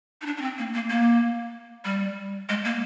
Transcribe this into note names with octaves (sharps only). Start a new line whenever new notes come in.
D#4
D4
D4
C4
A#3
A#3
A#3
G3
G#3
A#3